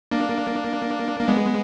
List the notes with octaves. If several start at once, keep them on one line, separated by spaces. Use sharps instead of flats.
A#3 D4
A#3
G#3 B3